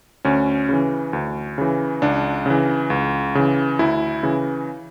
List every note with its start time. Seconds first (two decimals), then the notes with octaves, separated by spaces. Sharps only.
0.25 D2 C#4
0.69 C#3 E3
1.13 D2
1.58 C#3 E3
2.02 C#2 D4
2.46 C#3 E3
2.90 C#2
3.35 C#3 E3
3.79 D2 E4
4.23 C#3 E3